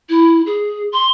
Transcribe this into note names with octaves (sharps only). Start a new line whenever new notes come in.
E4
G#4
C6